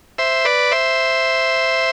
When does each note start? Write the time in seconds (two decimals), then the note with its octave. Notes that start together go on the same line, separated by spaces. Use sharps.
0.18 C5 E5
0.45 B4 D5
0.72 C5 E5